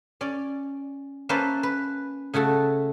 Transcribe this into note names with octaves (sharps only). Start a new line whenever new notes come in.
C#4 D5
A#3 C#4 B4 C5 E5 A5
B4
C#3 A3 F#4 A4